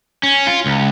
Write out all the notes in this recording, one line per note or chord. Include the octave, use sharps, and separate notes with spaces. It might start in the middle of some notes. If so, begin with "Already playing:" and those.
C#4
F4
C#2